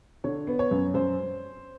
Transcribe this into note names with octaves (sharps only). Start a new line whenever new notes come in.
D3 C#5
B3
C#5
F#2
F#2 C5